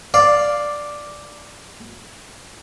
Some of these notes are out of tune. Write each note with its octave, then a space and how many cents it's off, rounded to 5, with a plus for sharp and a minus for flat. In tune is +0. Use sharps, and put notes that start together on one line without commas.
D5 +0 F5 +0